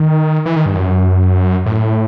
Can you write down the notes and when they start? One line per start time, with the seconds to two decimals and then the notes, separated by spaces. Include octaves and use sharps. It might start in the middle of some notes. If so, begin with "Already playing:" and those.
Already playing: D#3
0.46 E3
0.56 D#3
0.66 G2
0.76 F#2
1.66 A2